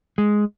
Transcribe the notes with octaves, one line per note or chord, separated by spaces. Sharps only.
G#3